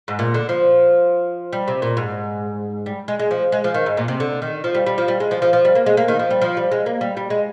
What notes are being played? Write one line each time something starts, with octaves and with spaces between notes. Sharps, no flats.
G#2
A#2
D3
F3
G3
C3
A#2
G#2
G3
G#3
G#3
F3
G#3
F3
D#3
G#2
A#2
C3
D3
D#3
F3
G3
G3
F3
G3
G#3
F3
F3
F3
G3
A#3
G#3
A#3
D#3
F3
G3
F3
G3
G#3
A#3
G3
G3
G#3